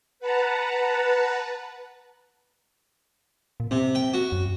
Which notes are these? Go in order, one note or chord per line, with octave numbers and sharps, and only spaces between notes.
B4 F#5 A5 A#5
A#2
C3 C4
G5
F#4
F#2